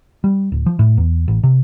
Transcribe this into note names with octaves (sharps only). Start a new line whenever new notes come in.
G3
D1
F3
A2
E2
A1
C3